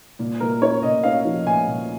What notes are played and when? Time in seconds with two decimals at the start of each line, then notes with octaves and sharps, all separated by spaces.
0.19 A#2
0.40 A#2 A#4
0.62 C#4 C#5
0.83 A#2 D#5
1.03 C#4 F5
1.25 F3
1.45 A#2 G#5
1.67 A#2